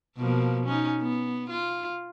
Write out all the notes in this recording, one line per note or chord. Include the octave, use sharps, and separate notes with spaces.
B2 F3 A#3
C#4 D#4
B3
F4